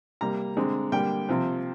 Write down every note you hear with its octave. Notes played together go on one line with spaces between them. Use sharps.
C3 G3 A#3 A#5
D3 G#3 C4
D3 G3 A#3 G5
C3 F3 C4